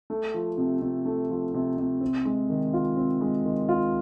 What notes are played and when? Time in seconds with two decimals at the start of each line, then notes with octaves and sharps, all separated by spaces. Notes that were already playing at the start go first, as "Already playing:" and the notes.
0.10 A3
0.34 F3
0.58 C3
0.82 C3
1.05 A3
1.30 F3
1.54 C3
1.78 C3
2.01 C4
2.25 G#3
2.50 D#3
2.74 F4
2.96 C4
3.21 G#3
3.45 D#3
3.69 F4